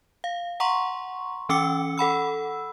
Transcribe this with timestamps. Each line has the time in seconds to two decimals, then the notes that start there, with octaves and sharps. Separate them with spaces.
0.24 F5
0.60 F#5 A#5 C6 C#6
1.49 E3 C#4 G5 D6 E6 C#7
1.98 A4 F#5 B5 E6